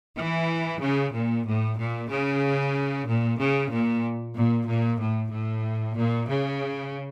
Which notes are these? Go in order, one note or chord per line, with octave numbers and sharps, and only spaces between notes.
E3
C#3
A#2
A2
A#2
C#3
A#2
C#3
A#2
A#2
A#2
A2
A2
A#2
C#3